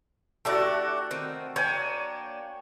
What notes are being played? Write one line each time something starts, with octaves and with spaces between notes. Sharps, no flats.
A3 D4 E4 F#4 G4
D#3 C4
A#3 D4 C#5 G5 G#5